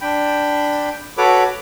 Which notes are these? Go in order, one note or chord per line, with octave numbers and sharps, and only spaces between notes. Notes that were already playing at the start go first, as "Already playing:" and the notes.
D4 G5 B5
F#4 A4 B4 C#5 B5 D6